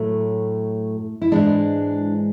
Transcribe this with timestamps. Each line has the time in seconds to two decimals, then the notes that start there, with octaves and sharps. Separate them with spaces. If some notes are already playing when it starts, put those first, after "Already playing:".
Already playing: A2 F#3 A3
1.22 E4
1.32 G#2 E3 G#3 D4